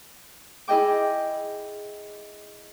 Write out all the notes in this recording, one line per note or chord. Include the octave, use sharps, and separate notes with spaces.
E4 G#4 D#5 G5 D6